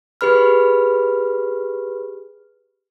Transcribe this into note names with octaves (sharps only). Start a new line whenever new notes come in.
G4 G#4 B4 B5 F6